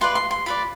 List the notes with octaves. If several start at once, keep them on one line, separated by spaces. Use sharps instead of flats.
F4 B4 D5 C6
C6
C6
F4 B4 D5 B5